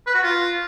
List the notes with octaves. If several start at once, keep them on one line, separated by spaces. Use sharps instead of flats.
B4
F#4
F4